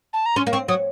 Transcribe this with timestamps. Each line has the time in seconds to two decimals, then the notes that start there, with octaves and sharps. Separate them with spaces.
0.13 A5
0.26 A#5
0.36 C#4 C6
0.47 A#3
0.52 C4 C#6
0.68 F#3 D#6